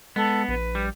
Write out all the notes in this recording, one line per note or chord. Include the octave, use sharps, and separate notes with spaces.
G#3 B3 A4
A#1 B4
G3